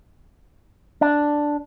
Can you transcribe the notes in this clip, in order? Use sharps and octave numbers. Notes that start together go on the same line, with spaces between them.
D4